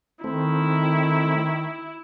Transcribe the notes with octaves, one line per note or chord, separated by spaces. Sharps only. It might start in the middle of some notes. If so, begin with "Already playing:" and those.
D#3 A3 C4 E4